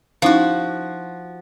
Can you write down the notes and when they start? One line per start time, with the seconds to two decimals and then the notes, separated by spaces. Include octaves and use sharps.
0.22 F3 C#4 D#4 E4 F#4